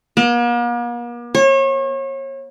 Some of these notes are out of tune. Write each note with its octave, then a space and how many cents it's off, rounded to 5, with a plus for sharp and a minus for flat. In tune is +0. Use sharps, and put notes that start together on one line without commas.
A#3 +45
C#5 -35